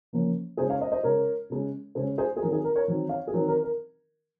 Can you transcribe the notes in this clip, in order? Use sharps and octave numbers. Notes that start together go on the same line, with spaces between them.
C#3 F3 A#3 C#4
C#3 G#3 C#4 G#4 C5
C#5 F5
C5 D#5
C5 D#5
C#3 G#3 C#4 A#4 C#5
C#3 G#3 C#4
C#3 G#3 C#4 G#4 C5
G#4 C5
G#4
D#3 F#3 C4 A#4
G#4
A#4
A#4 C#5
D#3 F#3 C4
C#5 F5
G#4
D#3 F#3 C4 A#4
A#4
A#4